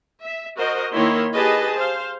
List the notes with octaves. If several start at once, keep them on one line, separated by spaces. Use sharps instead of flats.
E5
F#4 A#4 C5 D#5
D#3 A#3 E4 C#5 C6
G4 G#4 B4 D#5 A5
C5 F5